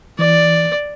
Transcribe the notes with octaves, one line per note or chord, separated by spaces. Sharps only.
E3 D5